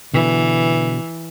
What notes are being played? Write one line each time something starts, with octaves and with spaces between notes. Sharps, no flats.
B2 D3 E3